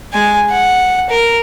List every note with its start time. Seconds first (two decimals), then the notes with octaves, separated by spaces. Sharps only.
0.13 G#3 G#5
0.50 F#5
1.10 A#4